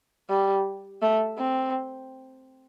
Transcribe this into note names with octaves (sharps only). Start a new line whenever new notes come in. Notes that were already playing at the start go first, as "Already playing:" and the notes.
G3
A3
C4